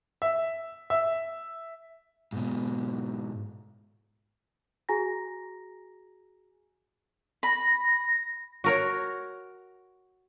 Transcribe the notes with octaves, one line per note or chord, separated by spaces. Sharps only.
E5
E5
G#2 B2
F#4 G#4 G#5 A#5 A#6
B5 A#6
F#4 A#4 C#5